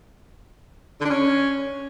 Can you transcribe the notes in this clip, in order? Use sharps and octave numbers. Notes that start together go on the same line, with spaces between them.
D3
D4
C#4